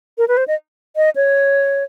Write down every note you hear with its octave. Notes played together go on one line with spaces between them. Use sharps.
A#4
B4
C5
D#5
D#5
C#5